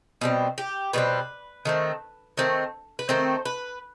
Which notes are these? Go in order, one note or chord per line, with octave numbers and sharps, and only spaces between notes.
B2 G3 C4
G4
B2 G3 C4 B4
D#3 A3 C4
D#3 A3 C4
B4
D#3 A3 C4 C5
B4